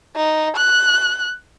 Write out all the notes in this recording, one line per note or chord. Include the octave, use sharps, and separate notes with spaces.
D#4
F#6